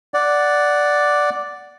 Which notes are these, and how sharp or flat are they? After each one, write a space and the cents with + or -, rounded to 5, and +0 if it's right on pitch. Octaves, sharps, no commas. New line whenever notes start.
D5 +0 F#5 +0